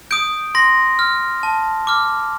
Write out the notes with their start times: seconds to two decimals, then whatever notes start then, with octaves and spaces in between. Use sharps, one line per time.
0.11 D#6 G6 D7
0.55 C6 A#6
0.99 F6
1.43 A5
1.87 D6 F6